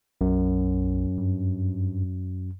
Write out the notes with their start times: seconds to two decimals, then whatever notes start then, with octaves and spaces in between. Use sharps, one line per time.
0.21 B1 F#2
1.18 G2